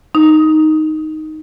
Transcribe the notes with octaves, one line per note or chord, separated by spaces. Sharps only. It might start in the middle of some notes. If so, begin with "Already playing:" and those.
D#4